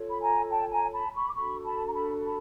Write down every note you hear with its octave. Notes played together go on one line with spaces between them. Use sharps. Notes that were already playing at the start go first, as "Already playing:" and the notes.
Already playing: F4 A4 C#5
B5
G#5 A#5
G5 A5
G#5 A#5
A5 B5
B5 C#6
D6
D4 F#4 A4 B5 C#6
A5 B5
A#5
A5 B5
A5 B5